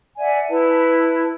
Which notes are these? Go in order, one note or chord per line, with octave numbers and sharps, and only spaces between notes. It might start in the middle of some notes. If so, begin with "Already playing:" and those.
D5 E5 F#5 G#5
E4 B4 A5